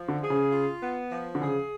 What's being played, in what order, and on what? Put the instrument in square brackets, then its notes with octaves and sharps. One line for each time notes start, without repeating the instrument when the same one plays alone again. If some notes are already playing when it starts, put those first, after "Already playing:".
Already playing: [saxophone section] F3
[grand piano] D3
[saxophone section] G#4
[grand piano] C#3
[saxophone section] F4
B3
F3
[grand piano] D3
[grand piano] C#3 [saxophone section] G#4